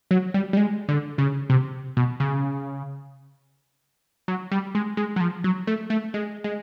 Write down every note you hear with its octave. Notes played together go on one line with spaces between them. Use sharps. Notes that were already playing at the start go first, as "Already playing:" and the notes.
F#3
G3
G3
G#3
D3
C#3
C3
B2
C#3
F#3
G3
G#3
G#3
F#3
F3
F#3
A3
A3
G#3
G#3